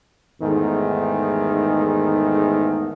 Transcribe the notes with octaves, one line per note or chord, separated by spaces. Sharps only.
E2 G#2 D#3 A3